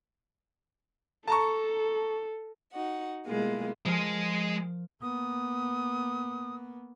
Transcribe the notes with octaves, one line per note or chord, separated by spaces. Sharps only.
A4 A5 A#5 C#6
D#4 F#4 F#5
B2 G3 G#3 A#3 E4 F4
F3 G#3 G#4 A#4
A#3 B3 D#6